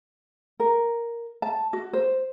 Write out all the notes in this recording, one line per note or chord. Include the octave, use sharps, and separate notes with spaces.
A#4
A5
F#4
C5